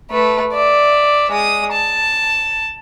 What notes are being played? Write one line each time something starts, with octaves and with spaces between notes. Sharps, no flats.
A3 B4
D5 E5
G#3 D#6
A5